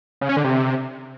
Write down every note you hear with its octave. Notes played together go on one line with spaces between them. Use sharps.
C#3
C#4
D3
C3